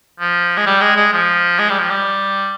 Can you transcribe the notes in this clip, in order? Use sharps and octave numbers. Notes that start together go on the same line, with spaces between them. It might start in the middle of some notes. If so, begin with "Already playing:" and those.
F3
G#3
G3
G#3
G#3
F3
G#3
G3
F3
G3